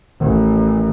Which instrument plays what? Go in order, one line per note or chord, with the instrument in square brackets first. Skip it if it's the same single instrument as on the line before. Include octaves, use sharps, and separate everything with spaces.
[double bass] A1 [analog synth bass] D#3